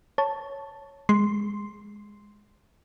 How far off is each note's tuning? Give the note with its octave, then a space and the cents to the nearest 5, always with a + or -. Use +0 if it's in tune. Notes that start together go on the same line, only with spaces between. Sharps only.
C#5 +0 A5 +0
G#3 -10 C6 +0